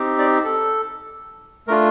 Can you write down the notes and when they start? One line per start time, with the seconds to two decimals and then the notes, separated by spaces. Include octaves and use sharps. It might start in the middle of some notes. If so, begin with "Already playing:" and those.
Already playing: C4 D#4 G4
0.19 D5
0.44 A4
1.68 A3 D4 F4 A#4